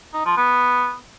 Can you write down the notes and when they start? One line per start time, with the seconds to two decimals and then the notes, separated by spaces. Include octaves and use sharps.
0.14 D#4
0.25 F3
0.37 B3